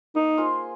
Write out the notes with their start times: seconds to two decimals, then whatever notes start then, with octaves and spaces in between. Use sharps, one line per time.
0.15 A#3 D#4
0.38 F4 G#4 C5